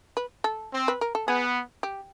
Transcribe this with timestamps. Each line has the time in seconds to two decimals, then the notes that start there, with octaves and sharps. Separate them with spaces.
0.17 B4
0.44 A4
0.73 C4
0.88 B4
1.01 A#4
1.15 A4
1.27 B3 G#4
1.83 G4